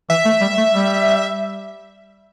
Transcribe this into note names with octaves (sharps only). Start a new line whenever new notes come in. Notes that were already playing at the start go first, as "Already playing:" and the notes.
E3 E5
A3
G3
A3
G3